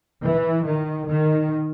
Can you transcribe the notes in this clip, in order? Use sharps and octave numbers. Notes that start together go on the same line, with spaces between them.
E3
D#3
D#3